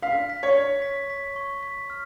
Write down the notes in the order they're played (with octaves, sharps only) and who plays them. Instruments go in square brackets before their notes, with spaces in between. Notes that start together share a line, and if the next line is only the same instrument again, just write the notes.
[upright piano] F5 [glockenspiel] B6
[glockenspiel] B6
[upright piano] C#5
[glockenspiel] C#6
B6
B6
C#6
B6
F6